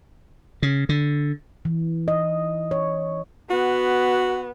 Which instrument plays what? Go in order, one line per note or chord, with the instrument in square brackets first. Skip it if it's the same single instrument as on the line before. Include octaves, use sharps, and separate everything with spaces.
[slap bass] C#3
D3
[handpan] E3
D#5
C#5
[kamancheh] B3 [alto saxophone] F#4